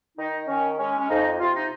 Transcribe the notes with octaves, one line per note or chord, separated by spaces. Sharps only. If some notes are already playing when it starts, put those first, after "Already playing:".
D#3 D#4
D#3 C#4
G#3 C#4
C#4
F2 D#4
C3 F4
D#4